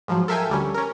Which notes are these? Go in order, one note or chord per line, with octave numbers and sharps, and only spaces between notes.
G#2 F3 F#3
A4 A#4 E5 F5 G5 G#5
D2 G3 C#4
C#4 A#4